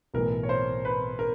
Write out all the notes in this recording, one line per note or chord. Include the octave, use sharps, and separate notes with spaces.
B1 A2 E3 A#4
C#5
C5
B4
A#4